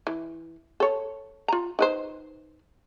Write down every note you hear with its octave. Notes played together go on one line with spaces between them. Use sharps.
E3
A4 C#5
F4 A#5
D#4 B4 C5